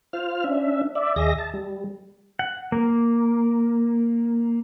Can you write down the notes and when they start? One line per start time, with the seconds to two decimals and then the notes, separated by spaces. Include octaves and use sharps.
0.13 F4 C5 F6
0.44 C#4 D4 E5
0.95 D5 E5
1.16 D#2 G#4 D#5 E5 A#6
1.38 A5
1.54 G3
2.39 F#5
2.72 A#3